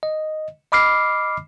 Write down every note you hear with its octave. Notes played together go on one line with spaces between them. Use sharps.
D#5
D#5 B5 D6 F6 C7